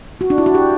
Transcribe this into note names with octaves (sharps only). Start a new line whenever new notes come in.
F#4
D4
E4
F#4
G4